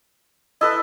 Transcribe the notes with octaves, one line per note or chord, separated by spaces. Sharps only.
E4 A4 B4 D#5